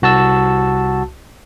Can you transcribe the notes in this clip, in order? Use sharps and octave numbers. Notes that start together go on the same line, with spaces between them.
C2 F#4 A5 E6